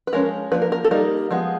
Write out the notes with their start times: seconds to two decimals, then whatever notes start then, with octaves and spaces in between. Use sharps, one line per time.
0.07 B4
0.13 F3 G#3 C#4 A#4
0.52 F3 A#3 D4 B4
0.62 A#4
0.72 A#4
0.85 A4
0.91 G3 A#3 D#4 A#4
1.31 F3 G#3 B3